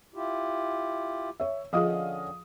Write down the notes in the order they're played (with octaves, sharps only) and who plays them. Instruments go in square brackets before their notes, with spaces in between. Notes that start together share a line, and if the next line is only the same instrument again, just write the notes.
[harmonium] E4 F4 G4
[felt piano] C#5 E5
[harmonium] D3 C#4 [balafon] F3 F4 G#4 [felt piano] D#5 F5 D#6